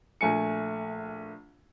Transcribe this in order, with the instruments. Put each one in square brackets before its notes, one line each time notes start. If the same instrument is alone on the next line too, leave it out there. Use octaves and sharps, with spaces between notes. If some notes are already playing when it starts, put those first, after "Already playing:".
[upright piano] A#1 A3 G#5 C#7